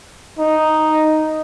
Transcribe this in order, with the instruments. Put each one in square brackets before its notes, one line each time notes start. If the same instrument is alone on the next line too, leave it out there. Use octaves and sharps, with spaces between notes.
[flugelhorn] D#4